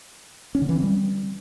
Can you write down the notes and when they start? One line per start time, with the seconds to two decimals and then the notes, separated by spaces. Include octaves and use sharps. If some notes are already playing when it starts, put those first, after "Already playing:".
0.55 C#4
0.62 D3
0.69 E3
0.76 C4
0.83 G3